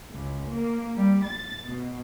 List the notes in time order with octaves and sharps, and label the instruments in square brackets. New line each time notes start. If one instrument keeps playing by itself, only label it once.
[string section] C#2
A#3
G3
A6
B2